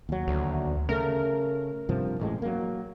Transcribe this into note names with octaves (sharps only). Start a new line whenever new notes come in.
D#2 F#3
D2
C#3 A3 A#4
G2 C3 F3
A1 A2 G#3
F#3 A#3